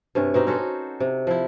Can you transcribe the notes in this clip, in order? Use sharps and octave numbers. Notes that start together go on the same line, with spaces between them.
G2 C3 C#4
B2 C4 D#4
C#4 F#4 A4 C5
C3
F3 E4